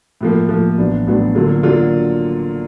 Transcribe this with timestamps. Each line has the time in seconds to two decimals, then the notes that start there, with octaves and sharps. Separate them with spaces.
0.21 A2 F3 A#3
0.49 A2 F3 A#3
0.77 A1 A2 F#3 B3 D4
1.07 A1 A2 F#3 B3 D4
1.35 D3 F#3 A#3 D4 F4
1.63 D3 F#3 A#3 D4 F4